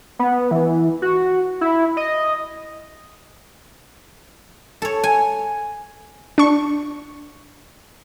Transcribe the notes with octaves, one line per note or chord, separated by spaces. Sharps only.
B3
E3
F#4
E4
D#5
A4 C#5
G#5
D4 C#6